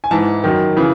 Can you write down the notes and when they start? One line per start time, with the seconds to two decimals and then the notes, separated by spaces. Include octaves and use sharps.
0.04 G#5
0.11 G#2 E3 A5
0.44 F#2 D#3
0.77 C#3 E3